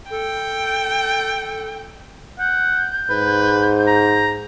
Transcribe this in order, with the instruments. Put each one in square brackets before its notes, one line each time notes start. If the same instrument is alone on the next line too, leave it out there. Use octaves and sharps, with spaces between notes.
[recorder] A4 [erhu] G5
[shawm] F#5 [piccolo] G6
[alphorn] G#2 [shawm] B4
[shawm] A#5